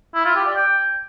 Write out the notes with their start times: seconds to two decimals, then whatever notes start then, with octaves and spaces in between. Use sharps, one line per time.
0.15 E4
0.25 F4
0.36 G4
0.46 D5
0.56 G5